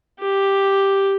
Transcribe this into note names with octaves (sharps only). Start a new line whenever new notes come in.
G4